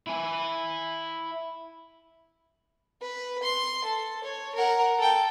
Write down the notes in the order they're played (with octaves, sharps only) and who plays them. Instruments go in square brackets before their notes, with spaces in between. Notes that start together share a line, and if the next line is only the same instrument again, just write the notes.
[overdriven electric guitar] E4 G#5
[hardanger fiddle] B4
C6
A4
C#5
A#4 F#5
A4 G5